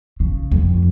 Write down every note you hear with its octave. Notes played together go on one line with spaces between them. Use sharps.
C#3
F2